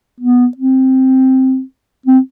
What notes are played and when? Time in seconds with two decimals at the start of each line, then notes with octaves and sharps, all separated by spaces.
0.20 B3
0.57 C4
2.06 C4